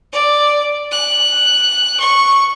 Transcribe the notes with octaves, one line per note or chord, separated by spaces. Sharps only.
D5
F#6
C#6